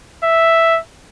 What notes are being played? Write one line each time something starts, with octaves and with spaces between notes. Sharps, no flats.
E5